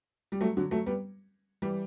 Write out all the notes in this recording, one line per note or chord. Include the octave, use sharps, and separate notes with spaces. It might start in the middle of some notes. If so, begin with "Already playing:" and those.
G3
F#3 A3
D3 F#3
F#3 A3
G3 B3
E3 G3